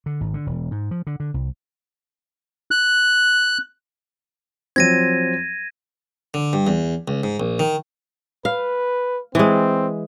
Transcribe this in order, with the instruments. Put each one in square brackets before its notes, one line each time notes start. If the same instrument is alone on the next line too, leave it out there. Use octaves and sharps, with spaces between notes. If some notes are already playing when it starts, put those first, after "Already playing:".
[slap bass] D3
G#1
D3
E1
G#2
F3
D3
D3
C2
[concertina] F#6
[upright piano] F3 F#3 C4 [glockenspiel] G#6 A#6 D#7
[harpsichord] D3
G2
E2
C#2
G#2
A#1
D#3
[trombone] B4 [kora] F5
[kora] E3 G#3 [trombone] C4